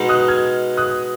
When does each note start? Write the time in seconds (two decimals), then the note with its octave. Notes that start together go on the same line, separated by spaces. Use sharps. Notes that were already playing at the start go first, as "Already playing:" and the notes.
Already playing: B2 G#3 D#4
0.09 D#6 F#6
0.28 F6 G#6
0.77 D#6 F#6